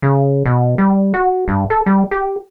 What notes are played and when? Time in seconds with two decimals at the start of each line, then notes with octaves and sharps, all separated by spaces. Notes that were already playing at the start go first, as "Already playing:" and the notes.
0.02 C#3
0.45 B2
0.78 G3
1.14 F#4
1.48 G2
1.70 A4
1.86 G3
2.11 G4